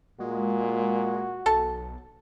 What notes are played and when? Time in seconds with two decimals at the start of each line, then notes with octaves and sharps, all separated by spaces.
0.20 A#2 G#3 F#4
1.46 B1 A4 A5